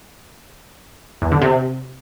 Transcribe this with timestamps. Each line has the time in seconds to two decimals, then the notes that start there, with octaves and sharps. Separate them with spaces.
1.22 E2
1.32 D3
1.42 C3